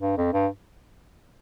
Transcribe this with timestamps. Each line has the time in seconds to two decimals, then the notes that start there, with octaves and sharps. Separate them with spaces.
0.01 G2
0.17 F2
0.33 G2